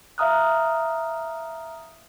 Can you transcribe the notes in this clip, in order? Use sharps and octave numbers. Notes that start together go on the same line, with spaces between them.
E5 F5 A#5 D#6 F6 F#6